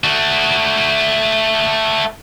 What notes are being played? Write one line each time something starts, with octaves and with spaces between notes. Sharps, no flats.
A3 F#4